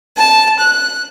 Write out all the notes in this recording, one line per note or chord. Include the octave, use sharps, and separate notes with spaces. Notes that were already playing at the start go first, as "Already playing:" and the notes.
A5
F#6